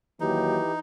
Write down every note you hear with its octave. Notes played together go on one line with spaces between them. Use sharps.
D#2 E3 F#3 D#4 G4